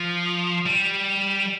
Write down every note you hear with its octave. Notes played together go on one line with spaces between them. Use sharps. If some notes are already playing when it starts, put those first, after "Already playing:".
Already playing: F3
G3